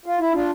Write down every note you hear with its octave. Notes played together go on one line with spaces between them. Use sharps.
F4
E4
D4 F4